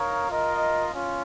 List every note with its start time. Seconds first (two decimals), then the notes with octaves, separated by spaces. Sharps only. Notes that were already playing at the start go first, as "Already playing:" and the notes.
Already playing: D#4 A#4 C#5 F5
0.28 F4 A#4 D#5
0.94 C#4 F4